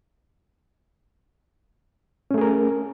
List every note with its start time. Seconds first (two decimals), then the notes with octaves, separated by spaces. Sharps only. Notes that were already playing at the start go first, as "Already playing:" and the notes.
2.31 C#4
2.34 A3
2.38 G#4
2.41 A#4